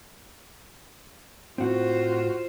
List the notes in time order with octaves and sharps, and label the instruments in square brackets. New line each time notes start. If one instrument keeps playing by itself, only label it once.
[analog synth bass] A2 [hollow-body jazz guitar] C4 F#5 [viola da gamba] F4 C5 [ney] F#4